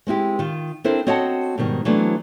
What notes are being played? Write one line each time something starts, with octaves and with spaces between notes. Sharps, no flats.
G#3 C4 E4 G4
D#3 F4
C4 D4 E4 A4 A#4 C5
C4 F#4 C#5 D#5 F#5 A5
G#2 B2 D#3 G3
E3 F#3 A3 B3 C4 D4